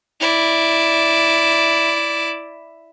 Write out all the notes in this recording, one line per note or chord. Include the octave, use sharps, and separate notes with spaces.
E4 D5